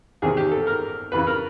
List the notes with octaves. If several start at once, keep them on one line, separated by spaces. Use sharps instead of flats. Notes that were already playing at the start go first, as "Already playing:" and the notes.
E2 C3 D#3 G#4
G4
A4
A#4
F2 C#3 E3 B4
A#4